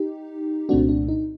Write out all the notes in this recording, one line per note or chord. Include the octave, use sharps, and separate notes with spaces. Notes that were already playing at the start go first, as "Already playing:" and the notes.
Already playing: D#4 G4
C2 A#2 A3 C4 D4 F#4
D4
D#4